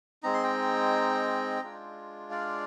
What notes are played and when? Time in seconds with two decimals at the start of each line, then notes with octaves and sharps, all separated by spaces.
0.23 G#3 C4 D#4 A#5
0.34 C6
0.43 G5 A#5
1.62 G#3 D4 F4
2.31 D5 F5